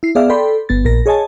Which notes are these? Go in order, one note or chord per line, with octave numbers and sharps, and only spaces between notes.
E4 C7
B3 G#4 D5 E5 F5
A4 D5 G5 B5 C6
G1 B3 A6
A#1 A#2 A#4 A#6
G#4 C#5 D#5 G#5 A5